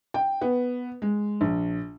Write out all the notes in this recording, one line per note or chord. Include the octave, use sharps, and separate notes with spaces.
G5
B3
G#3
A#1